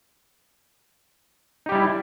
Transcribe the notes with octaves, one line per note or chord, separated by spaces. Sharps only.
G3 D#4 E4 G4